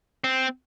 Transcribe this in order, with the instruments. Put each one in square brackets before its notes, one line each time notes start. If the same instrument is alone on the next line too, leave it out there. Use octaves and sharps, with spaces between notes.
[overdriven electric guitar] C4